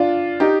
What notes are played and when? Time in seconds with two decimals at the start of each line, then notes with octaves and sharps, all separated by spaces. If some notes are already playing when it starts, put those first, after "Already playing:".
Already playing: D4 F4
0.40 D#4 G4